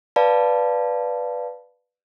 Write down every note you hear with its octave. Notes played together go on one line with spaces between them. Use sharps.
B4 D5 F5 A5 B5